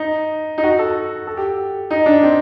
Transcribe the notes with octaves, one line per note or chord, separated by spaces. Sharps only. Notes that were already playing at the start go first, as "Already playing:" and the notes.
Already playing: D#4
D#4
F#4
A4
A4
G4
D#4
D4
C4